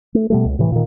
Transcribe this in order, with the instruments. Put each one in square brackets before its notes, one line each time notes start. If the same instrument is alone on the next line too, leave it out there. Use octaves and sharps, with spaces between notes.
[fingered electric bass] A3
B2 G3 A3
C#2
A2 C3 E3
A#2 D#3